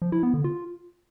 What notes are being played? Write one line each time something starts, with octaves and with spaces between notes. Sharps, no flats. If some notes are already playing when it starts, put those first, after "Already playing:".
F3
E4
B3
D3
F4